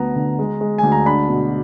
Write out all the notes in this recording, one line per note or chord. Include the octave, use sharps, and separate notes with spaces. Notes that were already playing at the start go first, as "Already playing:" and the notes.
Already playing: D2 B3 A#5
D3
G#3
G#3
D2 G#5
A#5
D4 B5
B2